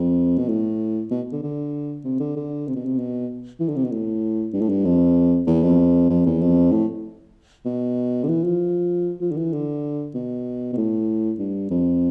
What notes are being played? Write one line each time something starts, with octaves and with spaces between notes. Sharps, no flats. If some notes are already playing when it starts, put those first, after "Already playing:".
Already playing: F2
B2
A2
B2
D3
D3
C3
D3
D3
C3
B2
C3
B2
E3
D3
C3
B2
A2
G2
A2
G2
F2
E2
F2
F2
E2
F2
A2
B2
D3
E3
F3
F3
D3
E3
D3
B2
B2
A2
G2
F2